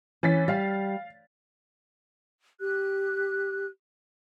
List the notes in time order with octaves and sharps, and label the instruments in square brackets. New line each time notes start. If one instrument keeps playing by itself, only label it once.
[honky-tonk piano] E3 A6 B6 [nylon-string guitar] C#4
[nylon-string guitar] G3 [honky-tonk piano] F5 A6
[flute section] G4 F#6